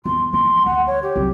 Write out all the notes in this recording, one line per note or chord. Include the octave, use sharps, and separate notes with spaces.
E2 C6
E3 A#3 C6
D2 F#5
C#5
G4
C2 F#3